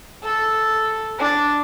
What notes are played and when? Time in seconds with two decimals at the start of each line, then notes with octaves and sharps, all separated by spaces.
0.23 A4
1.19 D4